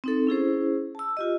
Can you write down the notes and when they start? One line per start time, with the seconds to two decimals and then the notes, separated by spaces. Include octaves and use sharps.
0.04 C4 D#4 A4
0.27 C#4 E4 G#4 C5
0.95 A5 E6
1.17 F4 G4 D#5